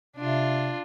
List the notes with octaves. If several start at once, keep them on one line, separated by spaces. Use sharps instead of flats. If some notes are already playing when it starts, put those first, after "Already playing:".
C3 D4 F4